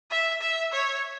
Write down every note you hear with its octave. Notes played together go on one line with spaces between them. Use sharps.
E5
E5
C#5